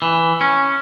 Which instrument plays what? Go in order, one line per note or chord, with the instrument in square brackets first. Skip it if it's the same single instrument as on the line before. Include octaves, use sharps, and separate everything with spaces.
[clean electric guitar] E3
C#4